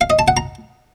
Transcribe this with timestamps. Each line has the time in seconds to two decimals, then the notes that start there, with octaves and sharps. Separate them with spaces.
0.01 F5
0.10 D#5
0.19 A5
0.28 F#5
0.37 A#5